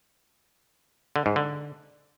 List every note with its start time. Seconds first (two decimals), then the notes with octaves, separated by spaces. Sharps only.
1.16 D3
1.26 G#2
1.36 D3